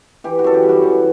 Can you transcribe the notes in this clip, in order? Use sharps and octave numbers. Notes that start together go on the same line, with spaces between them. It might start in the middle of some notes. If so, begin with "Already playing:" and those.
E3 G4
F#4
F#2 A4
G4
G3
F#4
E3